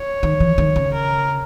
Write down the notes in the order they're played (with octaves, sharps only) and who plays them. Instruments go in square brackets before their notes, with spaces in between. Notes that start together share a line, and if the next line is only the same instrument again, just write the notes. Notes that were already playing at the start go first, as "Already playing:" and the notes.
Already playing: [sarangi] C#5
[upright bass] D#3
E3
D#3
C#3
[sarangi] A#4